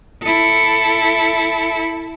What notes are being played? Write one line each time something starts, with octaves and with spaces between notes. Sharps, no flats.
E4 A4